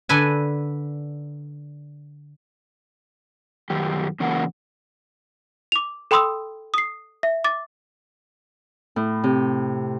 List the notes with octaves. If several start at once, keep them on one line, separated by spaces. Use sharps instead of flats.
D3 A4 B4 G#5
F#2 D#3 G4
C#3 E3 F#3 A#3 A#4 F#5
D6 F7
A4 G5 B5 C6 D#6 E6
D#6 C7
E5
D6 A6
A2
C3